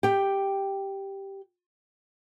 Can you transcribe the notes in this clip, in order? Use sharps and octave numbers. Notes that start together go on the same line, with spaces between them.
G4 G5